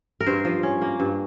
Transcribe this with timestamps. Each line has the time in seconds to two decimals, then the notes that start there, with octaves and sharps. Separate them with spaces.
0.21 A#4
0.26 G2 C5
0.45 F3
0.63 C#4
0.82 A#3
1.00 G2